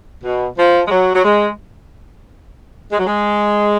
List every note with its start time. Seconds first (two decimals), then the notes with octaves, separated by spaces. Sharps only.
0.24 B2
0.58 F3
0.87 G#3
0.91 F#3
1.15 F#3
1.24 G#3
2.92 G#3
2.99 F#3
3.07 G#3